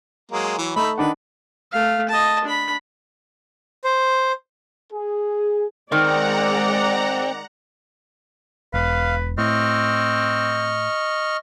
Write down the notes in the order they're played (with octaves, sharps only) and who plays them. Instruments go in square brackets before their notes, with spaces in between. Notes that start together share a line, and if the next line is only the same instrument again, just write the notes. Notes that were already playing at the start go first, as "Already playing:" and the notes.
[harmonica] F#3 G#3 A#3
E3 F#3
[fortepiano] A3 [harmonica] D#4 E5 B5
[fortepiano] D#3 D4 F#5 [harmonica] B4
[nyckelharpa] A3 F5
D#5 A5
D4 B5
[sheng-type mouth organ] C5
[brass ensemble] G#4
[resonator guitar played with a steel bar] D#3 [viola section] G#3 D5 [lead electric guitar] C4 [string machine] F#5 A#5
[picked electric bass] E1 [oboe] B4 [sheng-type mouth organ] F5
[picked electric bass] A2 [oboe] C4 [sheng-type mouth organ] D#5 C#6 F6